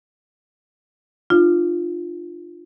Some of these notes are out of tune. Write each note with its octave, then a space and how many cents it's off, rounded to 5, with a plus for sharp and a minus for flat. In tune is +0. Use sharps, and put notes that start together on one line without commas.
D4 +45 F4 +0